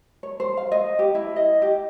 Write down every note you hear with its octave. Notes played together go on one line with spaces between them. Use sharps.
C#5
C5
F5
D#5
G4
E4
D#5
G4